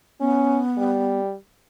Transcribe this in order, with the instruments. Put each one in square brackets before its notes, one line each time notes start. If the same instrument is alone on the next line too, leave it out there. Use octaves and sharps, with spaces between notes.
[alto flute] B3 [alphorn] C#4
[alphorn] G3